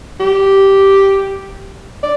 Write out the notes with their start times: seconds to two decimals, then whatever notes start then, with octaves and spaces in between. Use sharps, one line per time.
0.20 G4
2.03 D5